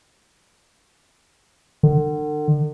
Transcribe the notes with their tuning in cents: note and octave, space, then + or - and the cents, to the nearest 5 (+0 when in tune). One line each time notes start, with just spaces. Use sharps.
D3 +40